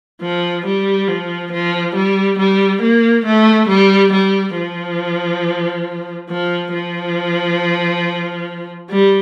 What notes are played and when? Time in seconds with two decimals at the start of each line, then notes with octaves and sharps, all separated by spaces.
0.22 F3
0.66 G3
1.08 F3
1.52 F3
1.95 G3
2.38 G3
2.82 A#3
3.25 A3
3.68 G3
4.12 G3
4.56 F3
6.30 F3
6.74 F3
8.90 G3